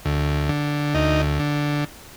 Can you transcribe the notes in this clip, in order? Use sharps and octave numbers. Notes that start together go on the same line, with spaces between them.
D2
D3
D2 D#4
D3